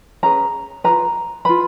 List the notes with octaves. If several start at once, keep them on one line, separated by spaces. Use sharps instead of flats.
C#4 G#4 B4 A#5
F4 G#4 B4 A#5
F4 B4 B5